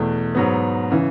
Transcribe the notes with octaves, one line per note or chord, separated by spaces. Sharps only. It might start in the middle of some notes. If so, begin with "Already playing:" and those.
Already playing: E2 B2 A3
G#2 F#3 B3
C#3 E3